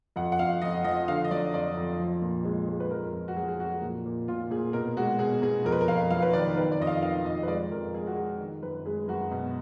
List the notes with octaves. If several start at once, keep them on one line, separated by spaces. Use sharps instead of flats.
F2 F#5
F#5
F2 F5
F2 D#5
F3 D#5
D3 F5
D#5
F#3 D5
F2 D5
F2
F3
A#2
G#3
G#3
B4
F2 A#4
F2
F#4
F#3 G#4
G#4
F2 F#4
A#2
A#2
A#2 F4
A#2 G#4
B2 A#4
G#3 F#4
B2 G#4
B2 G#4
F2 A#4
B4
A#4
F2 F5
F#3 F5
B4
D#3 D5
D#3 B4
D5
F2 D#5
F5
D#3 F5
F2 D#5
B4
G#3 D5
F2 A#4
G#3 G#4
F#4
G#3 G#4
D#3
F#2 B4
G#3 G#4
F#2 F#4
B2